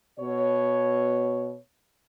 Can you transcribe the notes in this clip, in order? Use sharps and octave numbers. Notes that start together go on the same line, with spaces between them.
B2 C#5